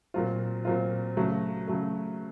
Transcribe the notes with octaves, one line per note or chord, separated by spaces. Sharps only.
A#2 F#3 C4 F4
A#2 F#3 C4 F4
C#3 F#3 A3
C#3 F#3 A3